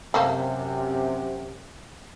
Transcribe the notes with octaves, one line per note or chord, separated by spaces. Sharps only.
F#2 C3 A3 A#3 G4